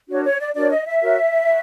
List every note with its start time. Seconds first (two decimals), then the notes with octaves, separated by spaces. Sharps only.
0.08 D4 F#4 A#4 C#5
0.25 C#5
0.39 D5
0.55 D4 F#4 A#4 C#5 D5
0.70 D#5
0.85 E5
1.01 F#4 A#4 C#5
1.47 F#4